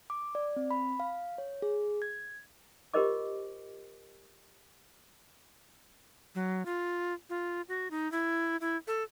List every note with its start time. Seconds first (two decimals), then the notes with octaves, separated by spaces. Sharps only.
0.10 D6
0.35 D5
0.56 C4
0.71 B5
1.00 F5
1.38 C#5
1.62 G#4
2.02 G#6
2.94 F4 G4 A#4 C5 D#5 D6
6.35 F#3
6.66 F4
7.30 F4
7.69 F#4
7.91 D#4
8.12 E4
8.61 E4
8.87 A4